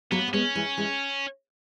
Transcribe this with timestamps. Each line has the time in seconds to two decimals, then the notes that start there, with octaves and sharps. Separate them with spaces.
0.12 F#3 A#3 B3
0.28 A#3
0.33 G#3 B3 C#4
0.55 E3 G#3
0.77 E3 G#3